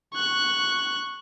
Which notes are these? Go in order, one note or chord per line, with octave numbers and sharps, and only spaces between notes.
C#6 F#6